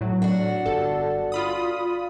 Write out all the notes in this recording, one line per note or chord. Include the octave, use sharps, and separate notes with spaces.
A2 F#3
D4 F#4
G1 A4
F4 B5 D#6